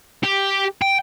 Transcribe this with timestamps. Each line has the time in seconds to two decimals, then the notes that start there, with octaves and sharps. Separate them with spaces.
0.24 G4
0.82 G5